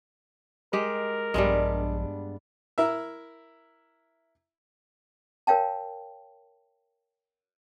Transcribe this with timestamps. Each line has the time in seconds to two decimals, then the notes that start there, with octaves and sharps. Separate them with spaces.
0.73 G#3 G4 A#4
1.34 A#1 G2 G3 G#3 B3 D4
2.78 E4 A#4 E5
5.47 A#4 C#5 F5 G5 A5